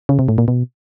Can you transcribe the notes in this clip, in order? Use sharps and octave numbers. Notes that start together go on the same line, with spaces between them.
C#3
C3
A2
A#2
B2